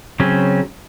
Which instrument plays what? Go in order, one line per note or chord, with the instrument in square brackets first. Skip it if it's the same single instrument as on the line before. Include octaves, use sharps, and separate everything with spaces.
[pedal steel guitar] C#3 F#3 C4 C#4